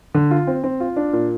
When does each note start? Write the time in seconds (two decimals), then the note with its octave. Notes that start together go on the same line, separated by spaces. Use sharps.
0.15 D3
0.31 F4
0.47 C4
0.64 C4
0.80 F4
0.96 D4
1.13 A#2